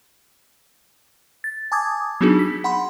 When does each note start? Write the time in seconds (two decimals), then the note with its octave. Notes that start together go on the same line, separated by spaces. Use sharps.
1.44 A6
1.72 G#5 A5 D6 D#6 G#6
2.21 F#3 B3 D4 D#4 F#4 G#4
2.39 B6
2.64 F#5 B5 C6